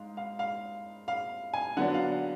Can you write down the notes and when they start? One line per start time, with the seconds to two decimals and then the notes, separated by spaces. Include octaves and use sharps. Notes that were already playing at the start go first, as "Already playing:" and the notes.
Already playing: G#2 F5
0.17 F5
0.39 F5
1.08 F5
1.54 G#5
1.77 D3 F#3 B3 D4 F#5
1.94 F5
2.12 F#5